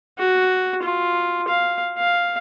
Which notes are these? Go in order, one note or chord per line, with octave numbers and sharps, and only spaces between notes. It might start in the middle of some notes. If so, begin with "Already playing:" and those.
F#4
F4
F5
F5